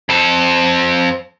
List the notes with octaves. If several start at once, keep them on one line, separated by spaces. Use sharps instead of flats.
F2 A4